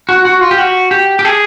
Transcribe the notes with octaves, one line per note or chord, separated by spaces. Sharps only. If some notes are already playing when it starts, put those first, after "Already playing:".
F#4
F#4
F4
G4
F#4
G4
G4
G#4